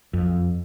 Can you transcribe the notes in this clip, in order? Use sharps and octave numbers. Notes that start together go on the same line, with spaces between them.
F2